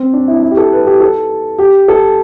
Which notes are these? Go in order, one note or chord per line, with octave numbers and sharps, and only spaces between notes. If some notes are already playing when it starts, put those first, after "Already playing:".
Already playing: C4
D4
E4
E4
G4
A4
B4
G4
A4
G4
A4